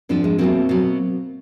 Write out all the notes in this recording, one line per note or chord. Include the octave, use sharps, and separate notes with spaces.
G#2 F3 C4 D4
G#3
E2 B2 F#3 A#3 C4
B2 F#3